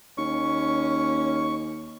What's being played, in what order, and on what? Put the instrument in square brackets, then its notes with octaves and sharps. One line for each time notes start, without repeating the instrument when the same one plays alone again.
[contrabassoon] D#2 [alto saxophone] C#4 [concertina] C#6